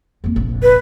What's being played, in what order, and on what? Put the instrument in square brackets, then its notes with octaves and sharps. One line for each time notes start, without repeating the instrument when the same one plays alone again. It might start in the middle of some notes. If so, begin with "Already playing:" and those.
[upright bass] F2 A#3
F1 A#1
[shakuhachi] B4